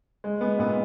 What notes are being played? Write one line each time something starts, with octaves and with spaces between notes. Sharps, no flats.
G#3
G#3 B3
A#2 B3